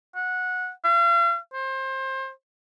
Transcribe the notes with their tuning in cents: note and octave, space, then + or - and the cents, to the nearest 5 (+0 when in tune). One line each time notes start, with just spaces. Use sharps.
F#5 -15
F5 -40
C5 +25